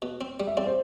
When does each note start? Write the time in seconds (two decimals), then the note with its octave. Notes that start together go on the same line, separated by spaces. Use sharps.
0.02 B2
0.21 C4
0.40 G3
0.47 E5
0.57 C4 D5
0.67 C5